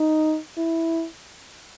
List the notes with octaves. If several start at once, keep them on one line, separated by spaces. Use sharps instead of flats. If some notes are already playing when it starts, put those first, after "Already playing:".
Already playing: D#4
E4